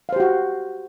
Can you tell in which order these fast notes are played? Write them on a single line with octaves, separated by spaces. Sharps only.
F5 C5 G4 F#4